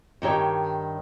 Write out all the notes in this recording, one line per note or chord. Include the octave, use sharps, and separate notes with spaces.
G2 D#3 G4 C#5